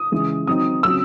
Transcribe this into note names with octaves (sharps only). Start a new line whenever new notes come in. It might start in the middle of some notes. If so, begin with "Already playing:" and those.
Already playing: D#6
C#3 E3 G#3
D#3 F#3 C4 D#4 D#6
C#3 F#3 C4 E6